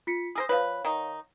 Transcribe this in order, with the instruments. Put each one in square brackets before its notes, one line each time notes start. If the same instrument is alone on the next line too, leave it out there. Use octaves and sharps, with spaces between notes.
[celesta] F4 B6 C#7
[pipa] G#4 A#4 C5 [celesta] D#6 E6 A#6
[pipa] F3 B4 [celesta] C#5 F5
[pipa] D#3 D#4